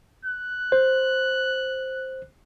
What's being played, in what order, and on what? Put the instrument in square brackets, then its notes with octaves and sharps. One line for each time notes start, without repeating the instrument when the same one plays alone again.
[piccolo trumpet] F#6
[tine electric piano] C5